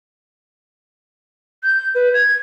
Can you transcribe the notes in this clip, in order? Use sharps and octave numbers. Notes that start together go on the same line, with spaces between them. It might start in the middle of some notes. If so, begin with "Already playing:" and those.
G6
B4
G#6